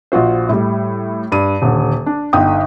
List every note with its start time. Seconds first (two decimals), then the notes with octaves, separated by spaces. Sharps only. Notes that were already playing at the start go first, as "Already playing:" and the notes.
0.12 A#1 F4 F#4 C5
0.49 A2 G3
1.32 G2 D#7
1.62 D#1 D3
2.06 D4
2.33 G1 D3 D#4 G5 D#6